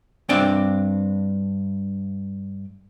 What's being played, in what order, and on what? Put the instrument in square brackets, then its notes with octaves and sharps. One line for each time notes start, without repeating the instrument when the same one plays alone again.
[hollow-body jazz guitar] G2 C4 D4 D5 G5